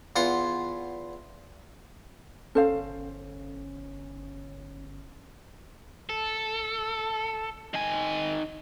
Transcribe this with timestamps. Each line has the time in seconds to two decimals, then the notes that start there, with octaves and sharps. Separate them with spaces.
0.16 E2 F4 F#5 C6
2.55 G1 C#4 A4 C5 F5
6.09 A4
7.74 D#3 G#5